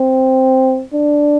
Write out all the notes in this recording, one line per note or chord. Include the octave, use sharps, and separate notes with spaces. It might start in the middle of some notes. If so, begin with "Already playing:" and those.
Already playing: C4
D4